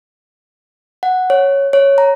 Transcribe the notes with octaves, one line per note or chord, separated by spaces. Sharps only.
F#5
C#5
C#5
A#5